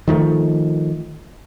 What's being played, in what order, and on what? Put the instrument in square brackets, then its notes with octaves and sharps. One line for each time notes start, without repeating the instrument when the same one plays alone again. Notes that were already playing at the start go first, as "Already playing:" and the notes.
[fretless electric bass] D#3 F3 G3 A3